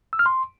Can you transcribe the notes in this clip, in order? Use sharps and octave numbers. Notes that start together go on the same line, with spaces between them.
E6
F6
C6